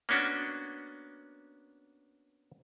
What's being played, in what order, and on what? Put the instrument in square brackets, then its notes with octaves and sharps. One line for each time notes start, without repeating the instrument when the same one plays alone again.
[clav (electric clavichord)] A#3 B3 C#4 D4 F#4